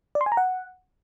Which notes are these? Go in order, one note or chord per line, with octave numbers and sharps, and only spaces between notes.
D5
C6
G#5
A#5
F#5